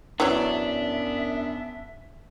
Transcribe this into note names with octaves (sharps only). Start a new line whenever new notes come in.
F#2 E3 F#3 B3 C#4 D4 E5